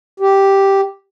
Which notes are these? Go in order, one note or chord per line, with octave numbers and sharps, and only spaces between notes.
G4